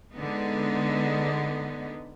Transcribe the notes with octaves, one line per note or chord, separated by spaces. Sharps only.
D3 G#3 B3 D#4